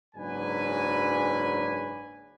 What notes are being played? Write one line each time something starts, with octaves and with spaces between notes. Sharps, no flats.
F#1 G#2 F#3 D4 B4 G#5